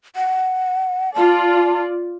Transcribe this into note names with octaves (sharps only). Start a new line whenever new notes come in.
F#5
F4 D5 A5